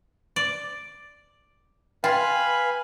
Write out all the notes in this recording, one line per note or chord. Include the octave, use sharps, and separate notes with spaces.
D5
F4 B4 F5 G5 G#5 B5